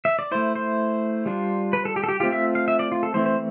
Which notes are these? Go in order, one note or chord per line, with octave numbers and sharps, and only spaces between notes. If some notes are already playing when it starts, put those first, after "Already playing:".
E5
D5
A3 E4 C5
C5
G3 D4 F4
B4
A4
G4
A4
G4
A3 C4 F4 G4
E5
F5
E5
D5
F4
A4
E3 A3 C4 E4 C5
C5